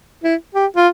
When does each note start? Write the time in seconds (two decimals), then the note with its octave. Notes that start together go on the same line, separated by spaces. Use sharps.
0.24 E4
0.55 G4
0.77 F4